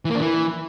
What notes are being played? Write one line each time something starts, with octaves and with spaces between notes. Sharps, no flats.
E3
A#3
D4
E3